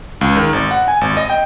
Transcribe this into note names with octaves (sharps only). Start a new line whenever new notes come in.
C#2
D#3
G#1
F#5
G#5
G#1
D#5
G5